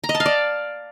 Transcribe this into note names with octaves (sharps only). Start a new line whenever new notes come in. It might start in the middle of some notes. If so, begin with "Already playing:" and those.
A#5
D#5
A5
F5
D5